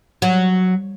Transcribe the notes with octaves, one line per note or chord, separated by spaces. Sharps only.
F#3